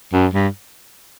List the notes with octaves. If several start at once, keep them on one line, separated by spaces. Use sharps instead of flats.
F#2
G2